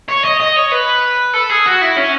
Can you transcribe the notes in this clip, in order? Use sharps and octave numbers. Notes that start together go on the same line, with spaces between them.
C#5
D#5
D#5
C#5
B4
A4
G#4
F#4
E4
C#4